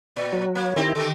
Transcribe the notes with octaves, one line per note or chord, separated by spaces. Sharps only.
A#2 D5
F#3
A#3 C#5
D#3 C4 E4 G4
D3 D#3 A4 D6